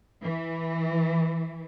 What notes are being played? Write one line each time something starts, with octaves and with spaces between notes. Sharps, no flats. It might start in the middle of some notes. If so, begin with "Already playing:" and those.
E3